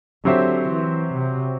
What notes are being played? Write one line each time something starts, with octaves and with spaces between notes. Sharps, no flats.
D3 F#3 C4 G4 C5 E5
E3
C3